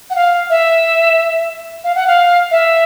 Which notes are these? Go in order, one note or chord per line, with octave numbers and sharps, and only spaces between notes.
F#5
F5
E5
F5
F#5
F5
E5